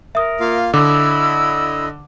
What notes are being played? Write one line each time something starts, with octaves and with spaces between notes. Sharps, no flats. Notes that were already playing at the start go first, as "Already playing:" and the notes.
A#4 E5 D#6
A#3 F4 F5
D3 E4 D#5 B5 D6 E6